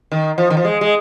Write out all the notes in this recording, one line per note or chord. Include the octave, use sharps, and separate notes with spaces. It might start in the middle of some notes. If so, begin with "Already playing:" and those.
D#3
F3
D#3
F3
G#3
G#3